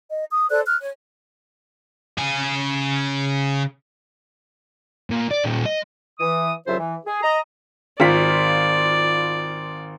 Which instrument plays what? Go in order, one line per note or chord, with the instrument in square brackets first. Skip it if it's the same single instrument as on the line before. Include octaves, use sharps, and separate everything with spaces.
[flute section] D#5
D#6
A4 C5 D5 F#6
F6 F#6
C#5
[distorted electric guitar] C#3 G#5
A#2
D5
A#2 G3
D#5
[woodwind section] E3 D#6
C2 C#3 F#3 F4 C5 E5
E3
G#4
D#5 A#5
[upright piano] G#1 F4 B6 [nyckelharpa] D5